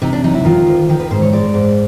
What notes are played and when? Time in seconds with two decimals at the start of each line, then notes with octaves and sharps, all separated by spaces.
0.02 C3 D#4
0.13 D4
0.24 F#3 D#4
0.34 E4
0.45 D#3 F4
0.67 D2
0.89 D#3 G4
1.00 B4
1.11 G#2 C5
1.22 C#5
1.33 G#3 D5
1.54 G#2